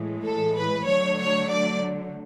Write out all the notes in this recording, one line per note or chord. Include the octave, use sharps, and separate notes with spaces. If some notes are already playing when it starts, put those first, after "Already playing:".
Already playing: A2 E3 G#3
A4
B4
D3 F#3 A3 C#5
C#5
D5